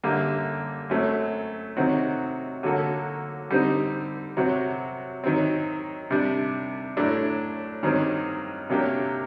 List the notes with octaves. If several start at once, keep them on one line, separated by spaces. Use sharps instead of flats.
F#2 D3 G3 A#3
F#2 F#3 A3 C4
C3 D#3 F#3 C4 F#4
D3 F#3 A#3 F#4 A4
D3 G3 C4 D#4
C3 F#3 C4 F#4
D#3 F#3 C4
C3 G3 D4
A2 F#3 A3 D4
G2 D#3 F#3 C4
C3 F#3 A#3 D4 G4